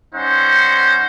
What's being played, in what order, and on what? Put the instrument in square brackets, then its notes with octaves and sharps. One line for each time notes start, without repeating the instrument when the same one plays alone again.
[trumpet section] G3 C#4 D#4 C5 F#5